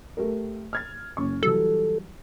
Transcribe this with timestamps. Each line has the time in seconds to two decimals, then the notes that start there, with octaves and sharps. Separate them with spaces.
0.17 A3 G4 A#4
0.73 F6 G#6 A6
1.17 F#1 C#4 C#6
1.43 E3 F#3 G3 A4